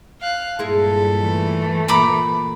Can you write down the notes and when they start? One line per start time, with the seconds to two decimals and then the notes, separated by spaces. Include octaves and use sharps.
0.21 F5 F#6
0.59 G2 A#2 G#3 E4 G#4 A4
1.20 E3 A3
1.88 A#2 A#5 B5 D6